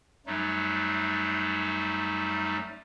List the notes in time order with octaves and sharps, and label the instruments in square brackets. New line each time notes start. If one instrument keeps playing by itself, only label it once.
[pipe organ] F#2 F#3 G3 A3 D#4